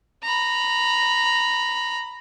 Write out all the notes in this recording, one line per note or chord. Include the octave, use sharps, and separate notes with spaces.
A#5 B5